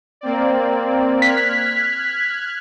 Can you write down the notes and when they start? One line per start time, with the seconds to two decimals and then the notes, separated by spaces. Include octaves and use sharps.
0.21 A#3 C4 D5
1.22 F6 F#6 G#6 B6